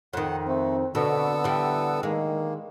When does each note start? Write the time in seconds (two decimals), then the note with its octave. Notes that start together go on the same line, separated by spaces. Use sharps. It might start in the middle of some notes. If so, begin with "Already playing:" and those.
0.13 F2 D#3 F#5
0.48 A3 C4
0.95 B2 D3 B3 A4 E6
1.44 E3 G3
2.03 D#3 G#3 A#3